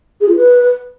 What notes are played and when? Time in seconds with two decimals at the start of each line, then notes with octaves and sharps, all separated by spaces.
0.21 G#4
0.28 F4
0.36 B4